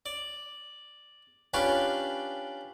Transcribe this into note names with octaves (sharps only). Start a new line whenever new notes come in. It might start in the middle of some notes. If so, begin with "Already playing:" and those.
D5
C#4 D4 F4 G4 B4 C#5